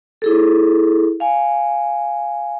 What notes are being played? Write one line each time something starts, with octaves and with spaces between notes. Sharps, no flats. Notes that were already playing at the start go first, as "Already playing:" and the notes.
E4 G#4 A4
F5 G#5